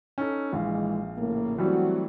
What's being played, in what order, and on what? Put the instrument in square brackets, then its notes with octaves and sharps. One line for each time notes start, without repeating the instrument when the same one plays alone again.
[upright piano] C#4 D#4 A4
[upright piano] A#1 F5 [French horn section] E3 G#3
[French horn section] A2 C#3 A#3
[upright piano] E3 F#3 G3 [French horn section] A3 C4 F#4